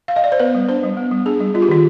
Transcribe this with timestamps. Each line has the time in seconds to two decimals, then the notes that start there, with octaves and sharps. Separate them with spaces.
0.08 F5
0.16 D#5
0.24 D5
0.32 C5
0.40 B3 B4
0.55 G3
0.69 D4 C5
0.83 G3
0.97 B3
1.11 G3
1.26 D4 G#4
1.40 G3
1.54 G3 F4
1.62 G4
1.69 D#3 F4